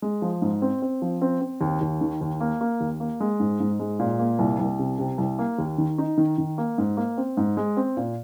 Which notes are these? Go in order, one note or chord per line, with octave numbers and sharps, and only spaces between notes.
G#3
F3
G#2
C4
C4
F3
C4
C4
D#2
D#2
D#3
D#2
A#3
A#3
D#2
A#3
G#3
G#2
G#2
G#3
A#2
A#3
C2
C2
C3
C3
C2
A#3
D#2
D#3
D#4
D#3
D#3
A#3
G#2
A#3
C4
G#2
G#3
C4
A#2